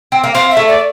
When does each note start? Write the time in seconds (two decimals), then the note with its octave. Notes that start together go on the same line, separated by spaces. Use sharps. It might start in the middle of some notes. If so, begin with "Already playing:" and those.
0.12 C4
0.24 A#3
0.35 C4 F5
0.51 E5
0.57 A3
0.68 D5